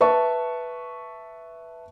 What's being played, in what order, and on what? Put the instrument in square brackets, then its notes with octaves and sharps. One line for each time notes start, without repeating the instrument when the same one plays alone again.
[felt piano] B4 E5 A5 C#6